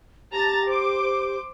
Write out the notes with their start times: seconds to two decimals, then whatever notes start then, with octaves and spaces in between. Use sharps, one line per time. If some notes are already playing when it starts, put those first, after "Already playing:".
0.33 G4 A5 A#5 A6
0.66 C5 D6